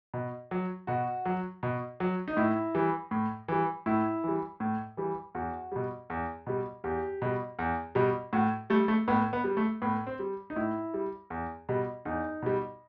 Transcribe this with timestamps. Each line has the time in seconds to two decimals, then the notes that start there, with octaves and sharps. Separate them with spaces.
0.14 B2
0.51 F#3
0.87 B2 F#4
1.26 F#3
1.63 B2
2.00 F#3
2.28 D#4
2.37 A2 E4
2.75 E3 G3
3.11 A2
3.48 E3 G3
3.86 A2 E4
4.24 E3 G3
4.60 A2
4.97 E3 G3
5.35 E2 F#4
5.72 B2 G3
6.10 E2
6.47 B2 G3
6.84 E2 G4
7.22 B2 G3
7.59 E2
7.95 B2 G3
8.33 A2 F#4
8.70 G3 A3
8.88 A3
9.08 A2 B3
9.33 B3
9.44 G3
9.57 A3
9.82 A2 B3
10.07 C4
10.19 G3
10.50 D#4
10.56 A2 E4
10.94 G3
11.30 E2
11.69 B2 G3
12.05 E2 D#4
12.42 B2 G3